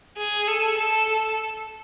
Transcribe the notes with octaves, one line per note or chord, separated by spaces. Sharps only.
G#4
A4
A4